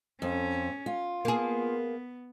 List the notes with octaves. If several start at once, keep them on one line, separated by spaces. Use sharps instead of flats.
F2 C#4
F4
A#3 B3 G#4